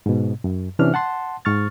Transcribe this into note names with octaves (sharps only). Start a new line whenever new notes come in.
G#2 B2
F#2
C3 E3 C#4 D4 F6
F#5 A5 C6
G#2 C#6 F6 A6